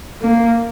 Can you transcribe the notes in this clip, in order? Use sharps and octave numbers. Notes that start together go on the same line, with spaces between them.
A#3